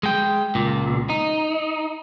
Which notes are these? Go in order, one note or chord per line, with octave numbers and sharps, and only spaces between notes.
G#3 G5
C#2 A#2
D#4